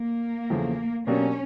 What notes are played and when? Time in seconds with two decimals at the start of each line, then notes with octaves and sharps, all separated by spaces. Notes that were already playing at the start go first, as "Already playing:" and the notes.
Already playing: A#3
0.50 E2 C#3 F3 A3
1.07 B2 F#3 A#3 C#4 D4 G4